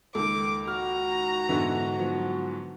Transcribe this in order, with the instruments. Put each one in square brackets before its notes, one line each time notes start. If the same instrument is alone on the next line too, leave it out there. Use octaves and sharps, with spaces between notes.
[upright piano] C#2 D#3 A#3 [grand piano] A4 [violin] D6
[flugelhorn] F#4 [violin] A#5 [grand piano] F6
[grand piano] G#2 D3 [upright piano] E3 B3
[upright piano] F3 F#3 B3